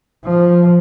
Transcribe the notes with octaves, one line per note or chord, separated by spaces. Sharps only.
F3